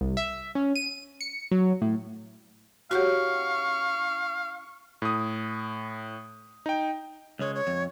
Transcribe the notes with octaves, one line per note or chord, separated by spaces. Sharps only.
C2
E5
C#4
D#7
C#7
F#3
A2
C#4 E4 F#4 G4 F5 F#5 C#6
A2 D#6
D#4 G5
C#2 G#3 C#5
C#5
F2